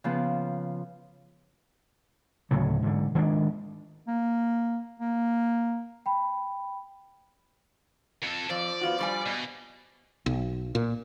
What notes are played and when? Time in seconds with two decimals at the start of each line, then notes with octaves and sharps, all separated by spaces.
0.04 C#3 F3 B3
2.51 D2 A2 C#3 F#3
2.83 G#2 D3
3.15 D#3 G#3 A#3 D4
4.08 A#3
5.00 A#3
6.06 G5 B5
8.22 F2 A4
8.50 F2 F3 D5
8.81 B3 F4 F#4
8.98 G2 G3 G#5
9.26 B2
10.26 B1
10.75 A#2